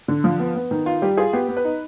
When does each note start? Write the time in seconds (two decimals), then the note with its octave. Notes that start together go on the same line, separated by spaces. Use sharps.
0.08 D3
0.24 F3
0.40 B3
0.56 B3
0.71 D#3
0.86 F4
1.02 G3 G4
1.17 F4 G#4
1.33 B3 G4
1.49 B3
1.57 B4
1.64 D#4